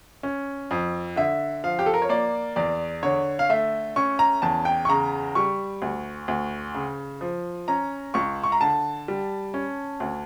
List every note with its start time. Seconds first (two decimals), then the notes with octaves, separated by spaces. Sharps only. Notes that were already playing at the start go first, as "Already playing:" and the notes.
0.23 C#4
0.71 F2
1.16 D3 E5
1.64 F3 F5
1.79 G4
1.86 A4
1.94 A#4
2.02 C#5
2.09 A#3 D5
2.56 E2 D5
3.03 D3 C#5
3.39 F5
3.49 A3 E5
3.96 C#4 C#6
4.19 A#5
4.42 E2 A5
4.65 G5
4.85 C#6
4.89 C#3 A#5
5.35 G3 C#6
5.82 D2
6.28 D2
6.74 C#3
7.21 F3
7.68 C#4 A#5
8.14 C#2 C#6
8.44 C#6
8.52 A#5
8.61 D3 A5
9.08 G3
9.54 C#4
10.00 D2